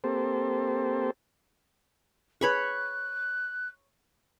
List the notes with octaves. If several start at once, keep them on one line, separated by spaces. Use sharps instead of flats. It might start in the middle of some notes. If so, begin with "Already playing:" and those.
A#3 C4 G4 A4 C5
G#4 B4 C#5 B5 C#6 F#6